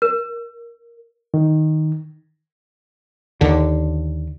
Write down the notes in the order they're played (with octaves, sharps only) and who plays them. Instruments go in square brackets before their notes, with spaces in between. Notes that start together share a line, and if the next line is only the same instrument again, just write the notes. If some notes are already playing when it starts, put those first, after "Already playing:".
[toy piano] A#4
[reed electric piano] D#3
[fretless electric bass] D#2 D3